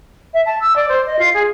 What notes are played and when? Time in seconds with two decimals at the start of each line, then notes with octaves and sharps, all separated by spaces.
0.34 E5
0.46 A5
0.60 E6
0.76 D5
0.89 C5
1.06 D#5
1.19 F4
1.34 G#4